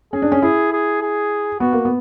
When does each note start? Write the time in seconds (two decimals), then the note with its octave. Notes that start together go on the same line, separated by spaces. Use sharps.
0.13 C#4 G#4
0.22 D4
0.32 C#4
0.42 E4 G#4
0.73 G#4
1.02 G#4
1.60 B3 F#4
1.73 A#3
1.85 B3